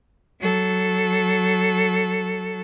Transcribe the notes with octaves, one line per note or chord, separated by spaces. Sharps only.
F#3 A4